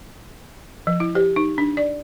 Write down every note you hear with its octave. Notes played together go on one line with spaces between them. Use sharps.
F3
E4
G4
D#4
D4
D5